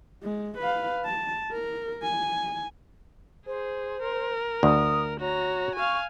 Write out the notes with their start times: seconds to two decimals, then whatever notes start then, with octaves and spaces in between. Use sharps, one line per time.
0.23 G#3
0.58 B4 F5
1.05 A5
1.53 A#4
2.03 G#5
3.47 G#4 C5
4.02 A#4
4.63 D2 D#6
5.20 F#4 C#5 A#5
5.75 F5 G#5 C#6